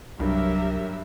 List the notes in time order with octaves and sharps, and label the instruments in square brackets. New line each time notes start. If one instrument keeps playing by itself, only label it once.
[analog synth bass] C2 [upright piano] G2 [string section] F#3 [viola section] G4 A#4 E5